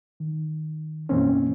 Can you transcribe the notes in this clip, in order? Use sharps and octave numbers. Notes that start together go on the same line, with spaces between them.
D#3
F#2 B2 E3 A#3 C4 C#4